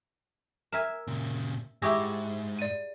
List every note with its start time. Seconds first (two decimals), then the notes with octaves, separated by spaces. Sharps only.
0.72 A#4 E5 G#5 E7
1.07 A#2 C#3
1.82 G#2 E4 G4 G#4 C#6 E6 A#6
2.59 D5 D#7